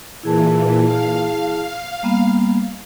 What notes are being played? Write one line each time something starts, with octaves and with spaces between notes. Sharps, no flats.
A#2 E3 E4 G#4 A5
F5
G3 A#3 B3